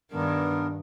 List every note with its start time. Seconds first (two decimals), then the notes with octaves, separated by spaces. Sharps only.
0.12 G2 D#3 B3 D4 A#4